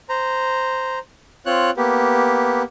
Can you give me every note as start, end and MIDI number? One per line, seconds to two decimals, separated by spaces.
0.09 0.99 72
0.09 0.99 82
1.46 1.70 60
1.46 1.70 65
1.46 1.70 73
1.46 1.70 90
1.77 2.63 58
1.77 2.63 59
1.77 2.63 67